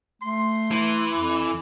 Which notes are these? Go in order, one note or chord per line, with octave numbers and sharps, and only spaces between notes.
A3 C6
E3
F2